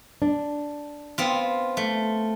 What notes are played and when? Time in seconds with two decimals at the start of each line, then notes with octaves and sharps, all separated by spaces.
0.22 D4
1.18 B3 C4 F4
1.77 A3